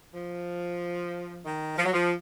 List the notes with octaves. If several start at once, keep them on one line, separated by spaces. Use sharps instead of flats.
F3
D#3
F3
F#3
F3